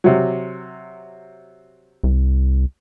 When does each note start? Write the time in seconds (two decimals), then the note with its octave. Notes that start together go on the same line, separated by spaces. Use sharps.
0.04 C3 F#3
2.04 C2